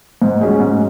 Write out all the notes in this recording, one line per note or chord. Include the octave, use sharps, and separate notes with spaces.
G#2
F#3 C#4 G#4
G#2